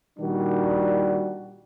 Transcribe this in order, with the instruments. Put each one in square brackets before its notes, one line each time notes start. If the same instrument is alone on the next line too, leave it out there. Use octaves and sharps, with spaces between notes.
[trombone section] A#2 D#3 G3 D4 F#4